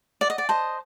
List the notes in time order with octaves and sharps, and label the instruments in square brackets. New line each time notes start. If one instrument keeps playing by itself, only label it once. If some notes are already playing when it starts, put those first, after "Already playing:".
[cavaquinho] D5 [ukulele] F#5
[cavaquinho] D#5
D5
[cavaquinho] C5 D#5 [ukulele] A5